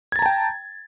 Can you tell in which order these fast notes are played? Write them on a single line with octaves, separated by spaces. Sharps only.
G#6 A6 A#5 A5 G5